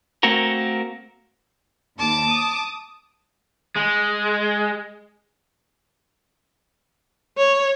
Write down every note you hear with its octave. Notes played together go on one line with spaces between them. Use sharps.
A3 A#3 C4 F#4 A#4
D#2 A5 D6
D#6
G#3
C#5